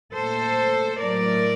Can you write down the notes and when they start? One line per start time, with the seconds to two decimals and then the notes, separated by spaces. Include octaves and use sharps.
0.14 A#2 A3 A4 C5
0.99 A2 F#3 A3 A#4 D5